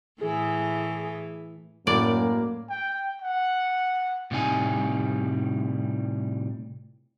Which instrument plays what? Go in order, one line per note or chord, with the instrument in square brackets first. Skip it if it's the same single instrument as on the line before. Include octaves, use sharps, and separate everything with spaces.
[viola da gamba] A2 E3 [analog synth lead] G#4
[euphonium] F#2 [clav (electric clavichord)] A2 [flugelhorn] A#3 [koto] D5
[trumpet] G5
F#5
[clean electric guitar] A2 C3 G3 D#4 G#5